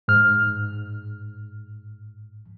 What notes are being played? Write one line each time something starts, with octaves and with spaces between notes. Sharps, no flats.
G#2 F6